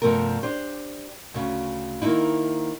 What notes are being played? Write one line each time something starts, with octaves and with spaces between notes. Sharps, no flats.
G2 C3 F3 A3 B3 A#4
D4 G4 C5
D2 C#3
D#3 A#3 C4 D#4 E4